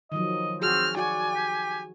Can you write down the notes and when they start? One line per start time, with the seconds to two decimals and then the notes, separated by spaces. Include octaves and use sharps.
0.12 D#3 F3 F#3 D#5
0.62 C4 F#4 G#4 F6
0.97 F#4 D5 G#5
1.35 G4